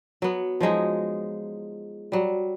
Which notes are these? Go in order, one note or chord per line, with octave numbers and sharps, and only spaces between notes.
F#3 B3
F3 F#3 G#3 D#4
F#3 G3